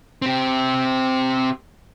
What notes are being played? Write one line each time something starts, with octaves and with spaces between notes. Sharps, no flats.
C4 G4